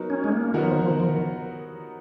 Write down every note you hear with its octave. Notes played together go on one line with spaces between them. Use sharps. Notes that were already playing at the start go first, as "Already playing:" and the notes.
Already playing: F#3 B3 D#4 F#4 A#4
C#4
G#3
A#3
D#3 F#3 B3 D#4 F#4 A#4
F3
D#3
F3
D#3
F3
D#3